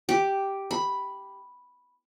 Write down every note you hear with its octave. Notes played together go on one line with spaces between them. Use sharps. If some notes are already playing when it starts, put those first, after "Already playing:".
G4
B5